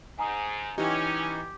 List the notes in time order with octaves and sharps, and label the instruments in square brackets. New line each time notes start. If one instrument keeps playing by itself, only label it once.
[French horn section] G#2 [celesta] G#5 A#5 D#6
[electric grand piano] E3 D#4 [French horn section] C#4 [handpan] G4